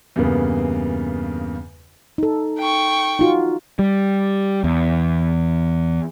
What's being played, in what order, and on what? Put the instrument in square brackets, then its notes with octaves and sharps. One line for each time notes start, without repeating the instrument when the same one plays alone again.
[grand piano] E2 G2 C#3 A#3 B3
[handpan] D#4 A4
[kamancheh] G5 C#6
[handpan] D#4 F4 F#4
[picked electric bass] G3
E2